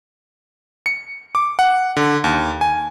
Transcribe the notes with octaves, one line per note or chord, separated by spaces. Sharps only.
C#7
D6
F#5
D3
D#2
G#5